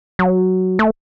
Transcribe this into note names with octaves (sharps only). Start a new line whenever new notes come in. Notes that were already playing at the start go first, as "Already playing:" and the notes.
F#3
A3